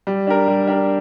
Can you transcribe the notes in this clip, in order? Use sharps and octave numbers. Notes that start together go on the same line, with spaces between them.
G3
D4 G4 A#4
G3
D4 G4 A#4